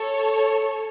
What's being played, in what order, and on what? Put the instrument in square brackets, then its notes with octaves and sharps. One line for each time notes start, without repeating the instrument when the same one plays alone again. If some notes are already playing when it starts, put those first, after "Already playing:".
Already playing: [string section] A4 C#5